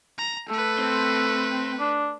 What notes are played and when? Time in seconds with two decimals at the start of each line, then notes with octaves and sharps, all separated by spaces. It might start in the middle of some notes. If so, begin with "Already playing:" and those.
0.18 A#5
0.49 A3 A4 B4
0.79 C4
1.80 D4